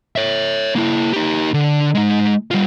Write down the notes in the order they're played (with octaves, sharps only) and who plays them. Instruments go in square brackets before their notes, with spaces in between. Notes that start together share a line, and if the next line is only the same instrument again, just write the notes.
[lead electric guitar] C#5 E5
A#3 E4
D#4 G4
D3
G#3 D#4
G3 F4